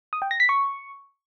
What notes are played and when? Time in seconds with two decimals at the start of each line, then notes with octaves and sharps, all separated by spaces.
0.13 D#6
0.22 G5
0.31 A#6
0.40 B6
0.49 C#6